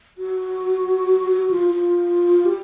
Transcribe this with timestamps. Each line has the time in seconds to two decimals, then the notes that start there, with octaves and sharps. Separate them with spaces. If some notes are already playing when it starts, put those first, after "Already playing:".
0.18 F#4
1.32 F#4
1.51 F4
1.70 F4
2.45 G4